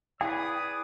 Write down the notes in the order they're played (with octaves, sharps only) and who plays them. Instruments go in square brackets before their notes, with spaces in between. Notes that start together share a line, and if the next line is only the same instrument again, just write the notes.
[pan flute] E4 [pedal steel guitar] G#4 B4 [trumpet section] D5 D#6 [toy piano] G5